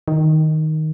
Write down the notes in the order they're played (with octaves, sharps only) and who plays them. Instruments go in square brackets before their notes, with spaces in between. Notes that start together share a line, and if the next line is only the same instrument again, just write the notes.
[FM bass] D#3